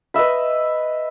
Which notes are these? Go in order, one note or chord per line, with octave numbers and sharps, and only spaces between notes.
B4 D#5 E5 B5